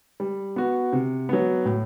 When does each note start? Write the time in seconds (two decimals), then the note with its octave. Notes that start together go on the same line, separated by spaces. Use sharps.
0.20 G3
0.56 B3 F#4
0.93 C3
1.29 F#3 B3
1.65 A2